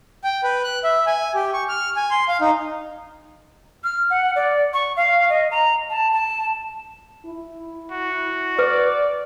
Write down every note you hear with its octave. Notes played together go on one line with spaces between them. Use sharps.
G5
B4
F#6
E5
G#5
G4
C#6
F6
G#5
C6
F5
D#4
F6
F#5
D5
C#6
F5
D#5
A#5
A5
A5
E4
F#4
B4 D5